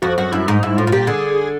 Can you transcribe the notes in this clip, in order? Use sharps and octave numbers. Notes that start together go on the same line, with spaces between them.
F2 F#4
F#2 F#4
F#2 E4
G#2 D#4
G#2 E4
A2 F4
A2
A#2 G4
D3 G#4